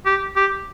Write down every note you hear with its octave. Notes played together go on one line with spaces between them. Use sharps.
G4
G4